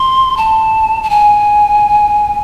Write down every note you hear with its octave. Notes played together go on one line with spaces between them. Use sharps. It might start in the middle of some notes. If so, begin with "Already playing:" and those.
Already playing: C6
A5
A5
G#5